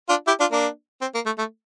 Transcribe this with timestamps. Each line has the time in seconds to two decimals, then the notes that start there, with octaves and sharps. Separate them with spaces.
0.09 D4 F4
0.27 E4 G4
0.40 D4 F4
0.52 A#3 D4
1.01 C4
1.15 A#3
1.26 A3
1.38 A3